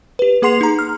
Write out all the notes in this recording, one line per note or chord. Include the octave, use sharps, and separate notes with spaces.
G4 B4
A#3 G#4 F#5 C6 C7 F7
D#4 A#5
F6